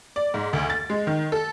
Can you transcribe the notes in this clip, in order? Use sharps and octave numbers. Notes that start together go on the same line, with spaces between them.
D5
G#2
D2
A6
G#3
D#3
A4